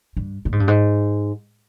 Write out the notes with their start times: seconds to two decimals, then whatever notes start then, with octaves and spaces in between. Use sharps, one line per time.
0.17 G2
0.45 A#2
0.52 G#2
0.60 G2
0.68 G#2